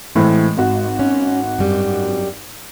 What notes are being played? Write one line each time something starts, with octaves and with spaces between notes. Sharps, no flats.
A2 E3 G#3 C4
G#1 F#4
C#4
F#2 G3